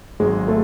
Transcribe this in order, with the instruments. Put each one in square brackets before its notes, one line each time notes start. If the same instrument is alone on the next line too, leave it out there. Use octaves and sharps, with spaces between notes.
[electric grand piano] G#1 G#2 F#3 [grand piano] G#3
[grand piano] A3